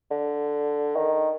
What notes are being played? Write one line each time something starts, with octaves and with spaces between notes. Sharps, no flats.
D3
D#3